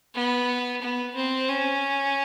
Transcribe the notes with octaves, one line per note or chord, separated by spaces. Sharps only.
B3
B3
C4
C#4